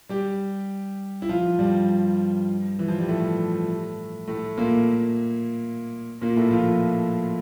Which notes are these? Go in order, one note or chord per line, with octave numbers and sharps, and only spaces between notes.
G3 G4
E4
F3 F4
G2 G3
E3
F3
G3
A2 A3
A2 A3
A#2 A#3
A#2 A#3
A2 A3
F3 F4